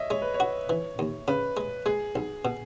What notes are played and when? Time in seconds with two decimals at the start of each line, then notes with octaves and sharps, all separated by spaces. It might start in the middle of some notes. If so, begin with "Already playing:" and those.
Already playing: C#5 D#5 E5
0.10 G#3 C#5
0.22 B4
0.34 C#5
0.40 F#4
0.70 E3
0.99 D#2
1.28 C#3 B4
1.57 G#3
1.86 G#3 G#4
2.16 B1
2.45 B2